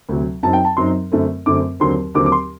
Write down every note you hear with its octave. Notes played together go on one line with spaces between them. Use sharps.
D2 C3 F#3
F#2 F#3 C4 D#4 A5
G5
A5
F#2 F#3 C4 D#4 C6
F#2 D3 A3 C4
F#2 D3 A3 C4 D6
D#2 D3 F#3 C4 C6
D#2 D3 F#3 C4 D6
D6
C6